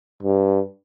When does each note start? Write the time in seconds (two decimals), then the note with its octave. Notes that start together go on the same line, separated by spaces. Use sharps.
0.23 G2